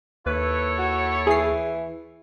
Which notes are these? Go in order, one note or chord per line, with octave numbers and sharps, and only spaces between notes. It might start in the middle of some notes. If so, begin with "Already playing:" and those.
D#2 E4 A4 B4 C#5
F#4
E3 G#4 C7